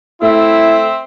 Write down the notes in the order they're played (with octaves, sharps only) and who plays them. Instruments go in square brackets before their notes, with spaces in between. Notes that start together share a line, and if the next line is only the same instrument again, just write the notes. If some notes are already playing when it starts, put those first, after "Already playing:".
[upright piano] A3 [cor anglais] C4 [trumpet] E4 [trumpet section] E5